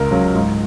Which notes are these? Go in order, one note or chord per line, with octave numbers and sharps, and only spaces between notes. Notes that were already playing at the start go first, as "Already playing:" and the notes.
Already playing: C#2 A#4
C#3 F#3
G#2